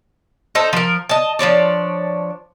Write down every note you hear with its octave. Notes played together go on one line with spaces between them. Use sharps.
D#4 A4 C5
F3 A#4
D#5 A5
F3 D4 C#5 D5